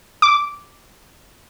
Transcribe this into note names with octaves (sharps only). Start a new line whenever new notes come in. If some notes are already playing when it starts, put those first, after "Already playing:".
D6